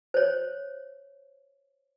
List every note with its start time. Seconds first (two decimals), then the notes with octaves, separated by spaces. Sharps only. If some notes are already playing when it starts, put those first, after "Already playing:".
0.14 C5 C#5